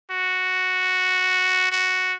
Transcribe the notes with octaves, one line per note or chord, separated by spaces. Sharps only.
F#4
F#4